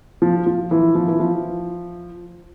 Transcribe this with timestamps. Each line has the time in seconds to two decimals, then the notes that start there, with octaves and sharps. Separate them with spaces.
0.22 F3
0.46 F3
0.71 E3
0.95 F3
1.07 E3
1.20 F3